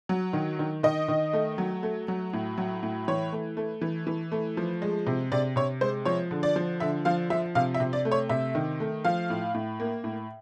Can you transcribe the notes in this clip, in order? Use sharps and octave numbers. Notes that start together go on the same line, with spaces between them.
F#3
D#3
D#3
D#3 D#5
D#3
A3
F#3
A3
F#3
A2
F#3
A2
E3 C#5
A3
A3
E3
E3
A3
F3
G#3
C3
C3 D5
C3 C#5
G#3 C5
F3 C#5
D3
D5
F3
D3 E5
F3 F5
F3 E5
C3 F5
E5
C3
D5
A3
C#5
C3 E5
D#3
A3
F3 F5
A2
A2
A#3
A2